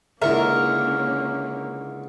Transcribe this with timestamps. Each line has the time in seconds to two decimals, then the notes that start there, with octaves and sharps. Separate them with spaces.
0.22 C#2 D3 A#3 C#4 E4 A#4 E5 C#6